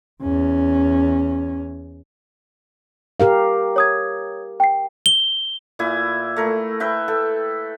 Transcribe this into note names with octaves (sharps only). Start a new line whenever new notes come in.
E2 C#4
G4 A#4 F5
C#5 D#6 G#6
G5 C7
G7
A#2 E4 G#5
A3 A#4
B4 E5 G5
A4 G5